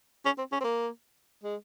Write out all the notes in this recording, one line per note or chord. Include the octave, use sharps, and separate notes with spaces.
C#4
C4
C#4
C4
A#3
G#3